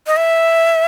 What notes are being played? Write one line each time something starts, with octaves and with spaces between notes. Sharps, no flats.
D#5
E5